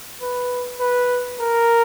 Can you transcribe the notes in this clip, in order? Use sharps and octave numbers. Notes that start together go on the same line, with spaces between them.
B4
B4
A#4